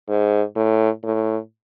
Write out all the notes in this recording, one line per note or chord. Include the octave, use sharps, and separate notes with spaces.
G#2
A2
A2